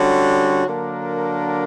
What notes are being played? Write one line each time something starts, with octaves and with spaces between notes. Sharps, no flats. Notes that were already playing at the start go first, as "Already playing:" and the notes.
Already playing: D3 G3 C#4 F#4
D3 F#3 A#3 D4 A#4